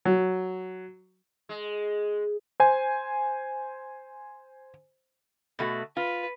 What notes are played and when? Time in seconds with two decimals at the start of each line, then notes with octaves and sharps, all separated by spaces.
0.05 F#3
1.49 G#3
2.60 C5 G#5
5.59 B2 A3 F#4
5.97 F4 B4